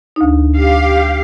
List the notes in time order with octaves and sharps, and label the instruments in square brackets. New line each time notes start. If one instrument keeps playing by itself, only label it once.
[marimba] D2 D#4
[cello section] G4 F5